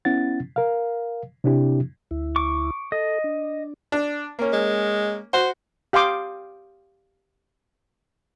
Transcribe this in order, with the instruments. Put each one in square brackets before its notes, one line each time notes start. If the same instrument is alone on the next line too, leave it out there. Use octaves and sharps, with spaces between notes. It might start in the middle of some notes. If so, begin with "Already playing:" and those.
[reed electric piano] B3 C#4 E4 F#5 A6
A#4 F5
C3 C4 D4 E4 G4
[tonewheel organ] D2 E4
[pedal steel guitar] C#6 D6
[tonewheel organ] A4 [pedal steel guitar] D#5
[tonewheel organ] D4
[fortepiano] D4
A#3 C#4
[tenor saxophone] G#3
[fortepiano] F#4 [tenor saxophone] C5
[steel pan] G4 F5 G5 C6 D6 D#6